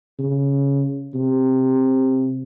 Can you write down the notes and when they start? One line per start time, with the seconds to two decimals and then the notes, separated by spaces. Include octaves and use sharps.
0.19 C#3
1.14 C3